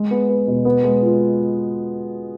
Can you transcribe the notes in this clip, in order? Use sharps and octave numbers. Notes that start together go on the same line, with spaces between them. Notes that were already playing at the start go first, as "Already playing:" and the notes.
Already playing: G#3
B3
B3
B2
B3
G#3
F4